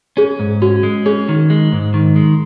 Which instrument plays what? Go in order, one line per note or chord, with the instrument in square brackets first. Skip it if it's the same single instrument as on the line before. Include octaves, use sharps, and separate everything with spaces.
[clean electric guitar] C#4 [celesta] G#4
[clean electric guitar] G#2
[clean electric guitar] C#4 [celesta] F#4
[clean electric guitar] G#3
[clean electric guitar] C#4 [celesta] G#4
[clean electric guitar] D#3
G#3
G#2
D#3
G#3